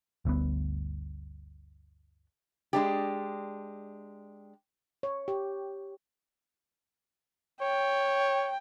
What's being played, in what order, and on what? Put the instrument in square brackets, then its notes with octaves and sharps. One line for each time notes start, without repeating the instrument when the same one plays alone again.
[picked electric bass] G1 D2 G2 B3
[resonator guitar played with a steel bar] G#3 D4 G4
[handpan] C#5
G4
[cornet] C#5 [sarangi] G5